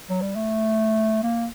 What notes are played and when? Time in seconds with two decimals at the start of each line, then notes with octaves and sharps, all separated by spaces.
0.10 F#3
0.22 G3
0.36 A3
1.23 A#3